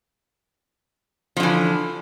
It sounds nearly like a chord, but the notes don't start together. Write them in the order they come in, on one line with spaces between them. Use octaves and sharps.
F3 D3 E3